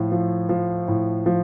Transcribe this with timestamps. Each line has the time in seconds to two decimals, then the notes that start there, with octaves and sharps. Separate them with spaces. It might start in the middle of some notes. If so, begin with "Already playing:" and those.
Already playing: A2 F3
0.12 F3
0.49 F3
0.88 A2
1.26 F3